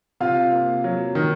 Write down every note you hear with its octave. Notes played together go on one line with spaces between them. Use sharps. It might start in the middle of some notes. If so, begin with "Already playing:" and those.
C3 F4 F5
A#3
F#3
D#3